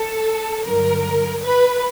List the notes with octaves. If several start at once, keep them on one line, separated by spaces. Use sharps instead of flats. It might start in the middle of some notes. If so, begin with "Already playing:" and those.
Already playing: A4
G2 D3 F#3 A#4
B4